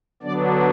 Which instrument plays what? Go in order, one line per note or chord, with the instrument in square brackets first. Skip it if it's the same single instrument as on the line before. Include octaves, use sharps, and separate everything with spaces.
[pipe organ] D3 F#3 B3 D4 D5